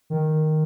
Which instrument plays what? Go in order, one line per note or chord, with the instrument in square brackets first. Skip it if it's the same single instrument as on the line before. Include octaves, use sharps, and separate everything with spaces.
[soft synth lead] D#3